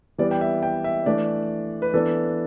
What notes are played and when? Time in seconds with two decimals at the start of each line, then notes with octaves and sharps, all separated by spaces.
0.18 E3 G3 B3 D5
0.31 G5
0.41 E5
0.63 G5
0.84 E5
1.06 E3 A3 D4 D5
1.82 B4
1.94 E3 B3 D4 A4